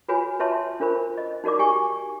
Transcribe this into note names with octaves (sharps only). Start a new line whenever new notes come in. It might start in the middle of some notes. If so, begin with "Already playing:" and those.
F4 F#4 B4 C#5 G#5 B5
F4 B4 C#5 E5 A5 C6
D4 F4 A#4 C5 B5
D#5
D#4 F#4 A#4 D5 D6
G4 G#5 C#6